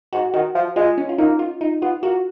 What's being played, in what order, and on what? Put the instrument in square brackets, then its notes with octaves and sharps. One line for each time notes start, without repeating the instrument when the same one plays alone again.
[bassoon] G#2 [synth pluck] F#4
[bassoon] D#3 [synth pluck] F#4
[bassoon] F3
[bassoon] G#3 [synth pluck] F4
[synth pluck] C#4
F4
[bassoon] A#3 [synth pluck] D#4
[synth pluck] F4
D#4
[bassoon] B3 [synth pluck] F4
[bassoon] A#3 [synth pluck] F#4